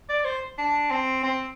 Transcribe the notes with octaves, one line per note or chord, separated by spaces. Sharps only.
D5
C5
D4
C4
C4